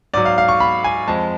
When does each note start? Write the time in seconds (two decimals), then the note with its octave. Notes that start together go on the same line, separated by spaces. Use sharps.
0.14 G#2 F#3 D5
0.25 F5
0.38 F5
0.49 C#6
0.60 B5
0.84 G#5
1.08 F2 F3 G#3 A5